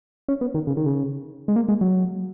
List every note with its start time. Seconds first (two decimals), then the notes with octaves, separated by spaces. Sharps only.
0.28 C#4
0.41 B3
0.54 D#3
0.67 C#3
0.77 D#3
0.86 C#3
1.48 G#3
1.56 A#3
1.68 G#3
1.81 F#3